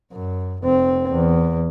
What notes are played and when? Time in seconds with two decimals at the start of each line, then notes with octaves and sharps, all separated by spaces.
0.13 F#2
0.63 F1 C4
1.12 E2